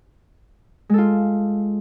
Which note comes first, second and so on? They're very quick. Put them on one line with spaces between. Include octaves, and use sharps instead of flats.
G#3 A4 F4